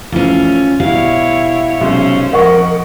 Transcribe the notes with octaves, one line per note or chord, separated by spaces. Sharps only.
E3 F3 A3 C#4 F4
B2 G3 E4 C#5 F5
B1 C3 G#3 C#4 C5
F2 A#4 D#5 F#5 C#6